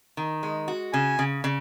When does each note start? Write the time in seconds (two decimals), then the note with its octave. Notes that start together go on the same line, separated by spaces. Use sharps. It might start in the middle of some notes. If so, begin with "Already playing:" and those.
0.17 D#3
0.43 G#3
0.68 F#4
0.93 C#3 G#5
1.19 C#3
1.44 C#3